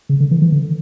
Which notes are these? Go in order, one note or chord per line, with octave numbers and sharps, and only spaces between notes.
C#3
D3
E3
E3
D3